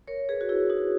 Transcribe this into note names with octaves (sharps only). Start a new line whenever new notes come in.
A#4 C#5
G#4 B4
F#4
E4 G#4
D#4 F#4